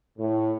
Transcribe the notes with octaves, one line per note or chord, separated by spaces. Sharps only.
A2